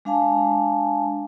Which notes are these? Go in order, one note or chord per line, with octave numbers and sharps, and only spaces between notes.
G#3 D4 F5 G#5 A5